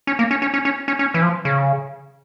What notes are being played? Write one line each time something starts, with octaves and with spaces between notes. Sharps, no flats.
C#4
A#3
C#4
C#4
C#4
C#4
C#4
C#4
E3
F3
C#3